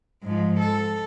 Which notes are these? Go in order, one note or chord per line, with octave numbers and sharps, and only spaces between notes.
G#2 F3
A4